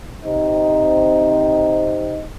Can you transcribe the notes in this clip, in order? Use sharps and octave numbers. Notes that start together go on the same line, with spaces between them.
C3 C4 D#4